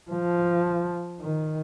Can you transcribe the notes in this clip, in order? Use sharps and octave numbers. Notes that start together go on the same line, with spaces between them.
F3
D#3